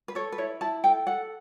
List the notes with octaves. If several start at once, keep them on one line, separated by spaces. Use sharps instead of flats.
B4
A4 C#5
B4
E4 C#5
E4 A5
A4 G5
A4 F#5